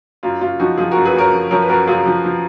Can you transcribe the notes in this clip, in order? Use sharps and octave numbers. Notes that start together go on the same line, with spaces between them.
F#2 F4
F#2 F4
F3 D#4 F#4
F3 F4 G#4
F#4 A#4
F#2
G#4 B4
F#2 A#4 C#5
F3
F3 A#4 C#5
B4
F#2 F#4 A#4
F#2 F4 G#4
F3
F3